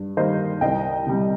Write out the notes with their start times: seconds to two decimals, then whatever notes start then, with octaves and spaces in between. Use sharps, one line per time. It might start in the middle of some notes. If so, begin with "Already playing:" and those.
Already playing: G2
0.17 D#3 G3 A#3 C5 D#5
0.61 C2 D#5 G5
1.07 C3 G3